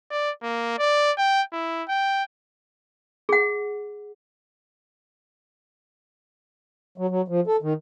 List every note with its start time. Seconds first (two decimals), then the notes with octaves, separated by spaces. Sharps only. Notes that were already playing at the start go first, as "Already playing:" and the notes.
0.11 D5
0.42 A#3
0.78 D5
1.18 G5
1.52 E4
1.88 G5
3.29 G#4 F#5
6.98 F#3
7.10 F#3
7.28 F3
7.47 A4
7.62 D#3